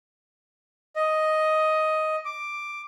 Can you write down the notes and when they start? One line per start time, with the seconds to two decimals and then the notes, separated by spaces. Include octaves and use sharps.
0.96 D#5
2.25 D6